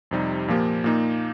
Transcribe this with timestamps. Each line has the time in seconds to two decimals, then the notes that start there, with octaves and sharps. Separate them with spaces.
0.11 F2 C3 G3 D#4
0.48 A#2 F3 A#3 G4
0.84 A#2 A#3 D#4